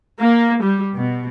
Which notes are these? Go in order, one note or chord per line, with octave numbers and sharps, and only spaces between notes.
A#3
G3
B2